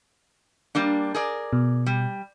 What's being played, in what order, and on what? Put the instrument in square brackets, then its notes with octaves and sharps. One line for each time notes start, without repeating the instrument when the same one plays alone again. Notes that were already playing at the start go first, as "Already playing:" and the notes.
[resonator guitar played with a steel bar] G3 A#3 D4
G#4 A#4 D5
[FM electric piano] B2
[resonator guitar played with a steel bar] G3